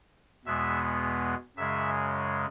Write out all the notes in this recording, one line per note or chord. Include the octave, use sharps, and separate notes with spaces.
E2 B2 G#3 B3 E5
F#2 C#3 G#3 E5